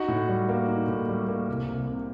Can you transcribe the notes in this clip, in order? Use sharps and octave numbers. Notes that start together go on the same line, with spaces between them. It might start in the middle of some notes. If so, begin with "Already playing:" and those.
Already playing: D#4 F#4 F#5
A2
G3
A#3
D#4
A2
G3
A#3
C2
C2
C3